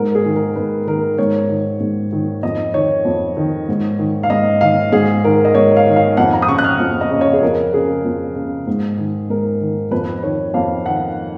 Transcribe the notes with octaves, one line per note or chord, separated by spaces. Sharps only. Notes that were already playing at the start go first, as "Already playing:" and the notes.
Already playing: G#2 A#4
G#4
D#3
A#4
G#2 B4
D#3 A#4
G#2 C#5
D#3
G#2
D#3
F2 D#5
D#3 C#5
F2
D#3
G#2
D#3
F5
G#2 D#5
D#3 F5
G#2 G#4
D#3 A#4
D#5
G#2 C#5
F5
D#3
F5
F2 F#5
A#5
D#6
C#3 C#6
F#6
F6
F2
D#5
C#3
C#5
G#4
F2 A#4
C#3 G#4
F2
C#3
G#2
D#3
G#2 A#4
D#3
F2 B4
D#3 C#5
F2 F5
D#3 F#5